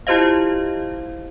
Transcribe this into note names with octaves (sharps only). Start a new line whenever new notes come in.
E4 F4 G4 C5 D#5 F5